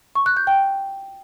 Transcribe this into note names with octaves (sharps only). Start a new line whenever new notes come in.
C#6
F#6
G6
G5